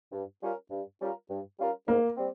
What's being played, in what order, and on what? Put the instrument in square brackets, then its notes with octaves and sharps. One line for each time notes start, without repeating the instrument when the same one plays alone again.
[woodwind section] G2
G3 C#4 F4 A#4
G2
G3 C#4 F4 A#4
G2
G3 C#4 F4 A#4
[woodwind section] G#2 [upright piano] A#3
[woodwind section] G3 C4